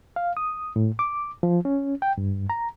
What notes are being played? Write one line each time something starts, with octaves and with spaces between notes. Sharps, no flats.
F5
D#6
A2
D6
F3
C#4
G5
G2
A#5